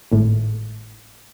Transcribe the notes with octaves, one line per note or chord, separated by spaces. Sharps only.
G#1 A2